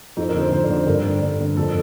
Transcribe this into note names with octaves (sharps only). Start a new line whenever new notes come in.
F2 D#4
A#4
D3
C5
F2 C5
D5
D3
C5
G2 A#4
D3
G2
D3
F2 A4